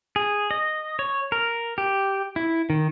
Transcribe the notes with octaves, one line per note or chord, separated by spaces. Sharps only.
G#4
D#5
C#5
A#4
G4
E4
D#3